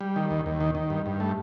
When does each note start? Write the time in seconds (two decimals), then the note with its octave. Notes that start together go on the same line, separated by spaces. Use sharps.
0.01 G3
0.16 D#3
0.31 D#2
0.46 D#2
0.60 D#3
0.75 D#3
0.90 G2
1.06 G2
1.20 A3